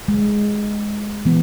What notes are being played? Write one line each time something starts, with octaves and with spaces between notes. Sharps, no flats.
G#3
E3 B3